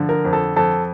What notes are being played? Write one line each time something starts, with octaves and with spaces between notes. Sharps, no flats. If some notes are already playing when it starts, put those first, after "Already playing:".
Already playing: D3 F3
A#4
F2
A4
F2 A4